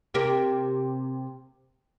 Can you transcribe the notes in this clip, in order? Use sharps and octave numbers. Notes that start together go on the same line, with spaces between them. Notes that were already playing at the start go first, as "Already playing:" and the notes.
C3 A#3 G4